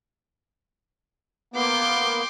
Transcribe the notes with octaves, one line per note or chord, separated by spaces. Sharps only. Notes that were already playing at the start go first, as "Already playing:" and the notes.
A#3 B3 G5 C6 D6